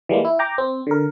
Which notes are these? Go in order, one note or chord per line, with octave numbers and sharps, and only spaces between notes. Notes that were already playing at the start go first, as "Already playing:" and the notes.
E3 G3 G#3 A#3
E4
G5 A#5 D6
C4
D3 A#4